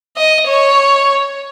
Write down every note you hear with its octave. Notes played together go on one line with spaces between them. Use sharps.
D#5
C#5